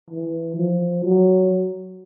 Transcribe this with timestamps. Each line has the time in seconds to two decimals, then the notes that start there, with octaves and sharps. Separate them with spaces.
0.10 E3
0.57 F3
1.04 F#3